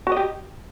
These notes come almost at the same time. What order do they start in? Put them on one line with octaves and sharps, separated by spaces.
F#4 D#5 G4